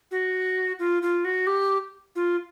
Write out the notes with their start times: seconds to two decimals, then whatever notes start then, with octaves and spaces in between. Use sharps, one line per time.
0.11 F#4
0.79 F4
1.02 F4
1.25 F#4
1.47 G4
2.16 F4